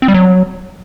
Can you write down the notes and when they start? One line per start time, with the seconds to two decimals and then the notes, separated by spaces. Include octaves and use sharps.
0.02 C4
0.08 G3
0.14 F#3